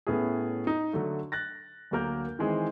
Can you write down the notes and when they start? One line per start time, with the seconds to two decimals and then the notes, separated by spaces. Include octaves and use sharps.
0.07 A2 B3 C#4 E4 G#4
0.67 D#4
0.93 D3 F#3 A3
1.32 F#6 A6 A#6
1.91 D2 F#3 A#3 A#4 G6
2.39 D#3 E3 G#3 C4 G#4